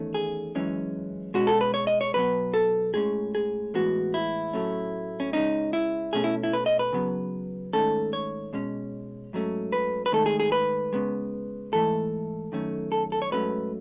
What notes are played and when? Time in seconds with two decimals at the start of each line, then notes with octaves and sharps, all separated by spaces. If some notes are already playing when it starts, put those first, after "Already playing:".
Already playing: E2 D#3 A3 C#4
0.14 G#4
0.55 F#2 E3 G#3 C#4
1.34 B2 G#3 C#4 F#4
1.47 A4
1.61 B4
1.74 C#5
1.87 D#5
2.01 C#5
2.14 B2 F#3 B3 B4
2.54 A4
2.94 A2 G#3 C#4 G#4
3.35 G#4
3.74 A2 E3 G#3 B3 F#4
4.14 E4
4.53 A2 F#3 A3 C#4
5.20 C#4
5.33 C#3 G#3 C#4 D#4
5.73 E4
6.13 B2 A3 C#4 G#4
6.24 E4
6.44 E4
6.53 B4
6.66 D#5
6.79 B4
6.93 C#3 F#3 B3
7.73 G#2 D#3 A3 C#4 A4
8.13 C#5
8.53 B2 G#3 C#4
9.33 G#2 F#3 A3 C#4
9.72 B4
10.06 B4
10.12 G#2 D#3 A3 A4
10.26 G#4
10.40 G#4
10.52 B4
10.93 C#3 G#3 B3
11.72 G#2 E3 A3 A4
12.52 F#2 D#3 A3 C#4
12.92 A4
13.12 A4
13.22 C#5
13.31 G#2 F#3 A3 C#4 B4